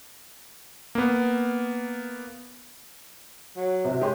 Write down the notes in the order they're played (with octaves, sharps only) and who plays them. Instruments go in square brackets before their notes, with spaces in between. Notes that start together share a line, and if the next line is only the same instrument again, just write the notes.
[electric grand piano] A#3 B3
[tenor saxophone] F#3
[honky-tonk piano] C3 F#4
[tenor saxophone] G#3 [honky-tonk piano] G4 C#5 C6